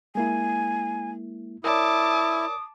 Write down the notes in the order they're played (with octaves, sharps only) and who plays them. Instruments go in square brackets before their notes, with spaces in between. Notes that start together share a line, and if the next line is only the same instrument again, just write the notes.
[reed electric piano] G#3 A#3 E4 [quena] G#5
[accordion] E4 [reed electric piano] A#4 C#5 D5 [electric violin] A5 D6 [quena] D#6